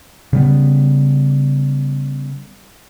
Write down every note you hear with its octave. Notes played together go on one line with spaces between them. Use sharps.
C#3 G3 B3